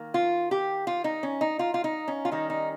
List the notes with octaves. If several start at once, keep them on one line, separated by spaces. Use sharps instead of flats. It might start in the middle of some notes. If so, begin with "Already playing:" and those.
Already playing: D#3 A#3
F4
G4
F4
D#4
C#4
D#4
F4
F4
D#4
C#4
F4
D#3 G3 C#4 D#4
D#4